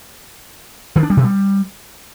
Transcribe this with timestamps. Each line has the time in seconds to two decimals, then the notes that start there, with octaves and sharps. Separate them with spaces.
0.96 D#3
1.03 D4
1.10 G3
1.17 B2
1.24 G3